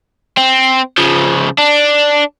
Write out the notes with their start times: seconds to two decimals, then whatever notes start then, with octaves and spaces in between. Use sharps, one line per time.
0.37 C4
0.98 C#3 F3
1.58 D4